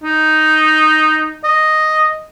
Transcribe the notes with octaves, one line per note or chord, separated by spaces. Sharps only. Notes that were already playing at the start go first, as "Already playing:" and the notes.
D#4
D#5